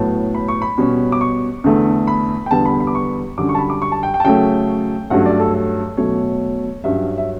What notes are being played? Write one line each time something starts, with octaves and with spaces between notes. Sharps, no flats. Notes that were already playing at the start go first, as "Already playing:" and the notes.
Already playing: A2 F#3 B3 A5
B5
C#6
B5
B2 G3 C#4
D6
C#6
E2 D3 A3
B5
G5
E2 D3 G3 B3 A5
B5
B5
D6
C#6
F#2 D3 G3 D6
C#6
A5
B5
D6
C#6
A5
G5
G5
A5
C#3 F#3 A3 C#4 G5
G2 F#3 A3 C#4 F#5
D5
A4
A4
B2 F#3 A3 C#4 C#5
G2 F#3 C#4 E5
E5